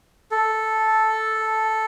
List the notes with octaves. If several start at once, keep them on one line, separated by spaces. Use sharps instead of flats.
A4